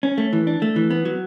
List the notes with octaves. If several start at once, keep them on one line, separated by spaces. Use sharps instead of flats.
C#4
A3
E3
D4
A3
E3
B3
F#3